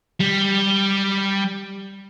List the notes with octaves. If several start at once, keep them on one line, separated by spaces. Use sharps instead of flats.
G3